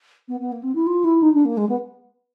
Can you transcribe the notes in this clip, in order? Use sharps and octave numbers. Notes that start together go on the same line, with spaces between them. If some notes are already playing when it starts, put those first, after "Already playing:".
B3
B3
A#3
C4
E4
F4
E4
D#4
D4
A#3
G#3
B3